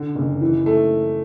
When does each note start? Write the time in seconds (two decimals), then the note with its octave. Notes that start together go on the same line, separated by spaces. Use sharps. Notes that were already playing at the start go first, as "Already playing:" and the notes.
Already playing: D3
0.15 F#1
0.41 E3
0.66 A3